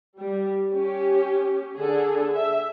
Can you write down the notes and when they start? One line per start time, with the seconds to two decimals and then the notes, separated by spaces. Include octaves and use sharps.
0.17 G3
0.70 C#4 G4
1.75 D3 G#4 A4
2.34 E5